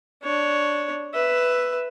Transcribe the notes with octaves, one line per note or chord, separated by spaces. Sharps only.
D4 C#5
B4 E5